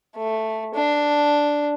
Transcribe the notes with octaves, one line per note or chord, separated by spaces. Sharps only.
A3
D4